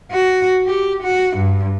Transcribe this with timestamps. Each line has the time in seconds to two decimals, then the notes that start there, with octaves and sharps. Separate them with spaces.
0.12 F#4
0.66 G4
1.03 F#4
1.37 G2